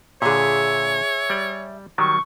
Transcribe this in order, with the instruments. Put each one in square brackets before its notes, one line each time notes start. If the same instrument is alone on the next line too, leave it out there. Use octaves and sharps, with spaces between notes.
[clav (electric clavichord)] A#2 D3 [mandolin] G#4 E5 [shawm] C#5
[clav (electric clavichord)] G3 D5
[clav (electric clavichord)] D#3 F#3 G3 [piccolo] C#6